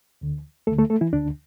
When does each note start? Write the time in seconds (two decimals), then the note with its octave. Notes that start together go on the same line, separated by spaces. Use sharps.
0.21 D2 D3
0.67 D2 D3 A3 A4
0.78 A3 A4
0.90 A3 A4
1.01 E3 E4
1.13 D2 D3 D4